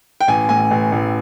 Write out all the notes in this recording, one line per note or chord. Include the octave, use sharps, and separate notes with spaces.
G5
A1 G#5
A2 G#5
A1
A1